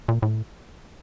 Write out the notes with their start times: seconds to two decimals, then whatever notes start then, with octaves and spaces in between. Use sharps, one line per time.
0.08 A#2
0.22 A2